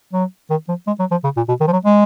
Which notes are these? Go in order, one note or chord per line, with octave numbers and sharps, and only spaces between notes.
F#3
D#3
F3
G#3
F#3
F3
C#3
A#2
B2
D#3
F3
F#3
G#3